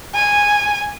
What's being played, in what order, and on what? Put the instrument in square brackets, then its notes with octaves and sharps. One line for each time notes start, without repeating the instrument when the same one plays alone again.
[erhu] G#5